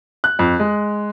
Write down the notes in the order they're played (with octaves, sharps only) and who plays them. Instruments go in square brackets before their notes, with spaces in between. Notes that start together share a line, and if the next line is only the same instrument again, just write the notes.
[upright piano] F#6
F2
G#3